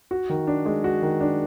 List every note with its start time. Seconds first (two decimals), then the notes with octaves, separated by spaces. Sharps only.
0.11 F#4
0.29 D#3
0.47 D4
0.66 G#3
0.84 F#4
1.02 D#3
1.21 D4